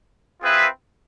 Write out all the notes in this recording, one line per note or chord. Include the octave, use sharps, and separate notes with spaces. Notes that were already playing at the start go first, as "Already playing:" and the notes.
C4 F4 G#4 B4 E5